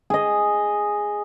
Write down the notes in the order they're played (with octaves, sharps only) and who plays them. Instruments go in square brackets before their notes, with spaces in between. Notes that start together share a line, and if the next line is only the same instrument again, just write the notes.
[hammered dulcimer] G#4 D#5